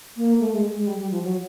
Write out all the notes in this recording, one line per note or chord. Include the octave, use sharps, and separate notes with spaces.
A#3
A3
G#3
G#3
G3
G3
F3
F#3